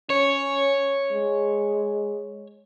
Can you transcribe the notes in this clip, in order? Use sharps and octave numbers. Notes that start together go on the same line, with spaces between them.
C#4 C#5
G#3